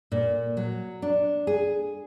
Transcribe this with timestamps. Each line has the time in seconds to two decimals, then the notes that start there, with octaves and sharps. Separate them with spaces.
0.12 A#2
0.57 F#3
1.02 D4
1.47 G#4